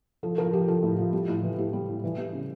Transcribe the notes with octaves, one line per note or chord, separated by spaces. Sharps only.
F3 A4
F3 A#4
F3 G4
F3 A4
A2
F3
G3
A2
E3
A2 G4
G3
A2
E3
G3
C#3